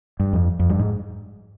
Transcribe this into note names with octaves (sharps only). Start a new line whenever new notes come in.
G2
F2
F2
G2
G#2